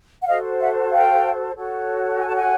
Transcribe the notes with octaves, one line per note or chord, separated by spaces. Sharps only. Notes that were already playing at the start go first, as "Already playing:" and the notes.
F#5
F#4 A4 C5 D#5 F5
E5 F#5
F5 G5
F#4 A4 C#5
G#5
A5
F#5 G#5